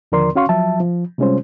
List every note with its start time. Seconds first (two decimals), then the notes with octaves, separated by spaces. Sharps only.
0.12 D#2 D3 F3 A#4 D5 C6
0.35 C#4 F#4 F5 C6 C#6
0.49 F3 F#3 E5 A5
0.80 F3
1.18 C3 G3 G#3 C#4 F4 C5